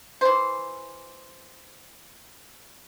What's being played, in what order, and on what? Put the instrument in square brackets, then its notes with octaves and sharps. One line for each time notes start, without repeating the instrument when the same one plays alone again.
[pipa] E3 C5